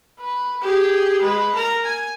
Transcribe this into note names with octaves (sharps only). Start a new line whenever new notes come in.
B4
G4 G#4
G#3 B4
A#4 A#5
G#5